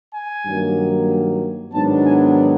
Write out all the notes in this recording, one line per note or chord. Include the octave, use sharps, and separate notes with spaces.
G#5
G2 D#3 F#3 A#3
G#2 D#3 F#3 B3 D4 A5
G#5